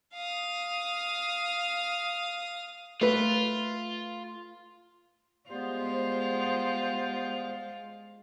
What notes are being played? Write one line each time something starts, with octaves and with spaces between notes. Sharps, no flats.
F5 D#6
A3 F4 B4
G3 G#3 B3 F4 C5